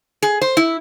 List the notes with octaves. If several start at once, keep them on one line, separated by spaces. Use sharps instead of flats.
G#4
C5
E4